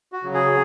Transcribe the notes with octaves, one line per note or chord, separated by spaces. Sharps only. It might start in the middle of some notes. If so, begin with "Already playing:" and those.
F#4
C#3 F#3
G#4